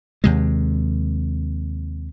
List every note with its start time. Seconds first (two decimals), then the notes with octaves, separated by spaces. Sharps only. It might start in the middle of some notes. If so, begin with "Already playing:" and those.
0.24 D#2 C3 G#3